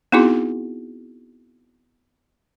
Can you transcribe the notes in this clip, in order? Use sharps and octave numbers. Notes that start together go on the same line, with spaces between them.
B3 C4 D#4 E4 F#4 G#4